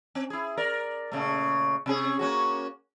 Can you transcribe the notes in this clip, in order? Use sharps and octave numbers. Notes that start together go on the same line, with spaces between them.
C4
E4 G#4
A#4 D5
A#2 C#3 A3
C3 C#4 G#4
A#3 C#4 F#4